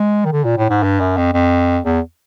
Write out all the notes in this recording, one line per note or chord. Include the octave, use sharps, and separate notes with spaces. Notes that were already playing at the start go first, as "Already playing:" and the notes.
Already playing: G#3
D#3
D3
A#2
A2
G#2
G2
F#2
F2
F2
E2